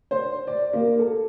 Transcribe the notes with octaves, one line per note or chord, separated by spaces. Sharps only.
C5
D5
A#3
A4